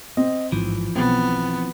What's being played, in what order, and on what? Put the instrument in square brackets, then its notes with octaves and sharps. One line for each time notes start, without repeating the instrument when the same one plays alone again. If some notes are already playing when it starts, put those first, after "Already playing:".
[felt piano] C4 [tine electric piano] D#5
[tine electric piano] A1 G#2 [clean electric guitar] E3 F3
[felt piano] B1 [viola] B3 [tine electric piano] C4 A6